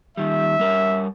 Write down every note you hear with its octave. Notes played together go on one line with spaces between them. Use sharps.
D#3 G3 E5
G3 A#4 C#5